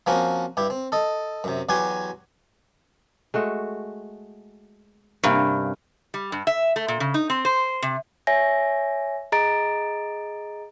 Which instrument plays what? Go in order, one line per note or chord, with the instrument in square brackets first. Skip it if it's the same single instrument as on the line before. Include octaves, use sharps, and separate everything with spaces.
[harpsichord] F3 A#3 C4 C#4 F#4 A#4
G2 E4 G4
C4
A4 D#5
F#2 C3
E2 F#3 F#4 G4 G#5 C6
[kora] G#3 A3 F#4
[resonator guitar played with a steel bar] G2 [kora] C3 A#3 C#4
[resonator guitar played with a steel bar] G3
G2
E5
A3
A#2
C#3
D#4
C4
C5
C3
[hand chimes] C#5 E5 G#5 A#6
G#4 D#5 A#5 A6 D7